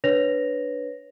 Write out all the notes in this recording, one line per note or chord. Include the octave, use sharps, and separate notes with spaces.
D4 B4 C#5 A#6 F7